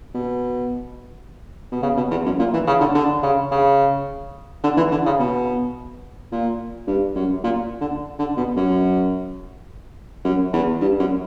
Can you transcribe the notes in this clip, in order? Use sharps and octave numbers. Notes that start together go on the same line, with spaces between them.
B2
B2
C#3
B2
E2
F#2
A#2
E3
C#3
D3
D3
C#3
C#3
D3
E3
D3
C#3
B2
A#2
G2
F#2
A#2
D3
D3
B2
F#2
F#2
E2
G2
F#2